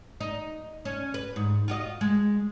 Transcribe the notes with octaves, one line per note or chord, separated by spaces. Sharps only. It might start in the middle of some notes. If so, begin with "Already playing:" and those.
D#4
C#4
B4
G#2
F4 F#4 D#5
G#3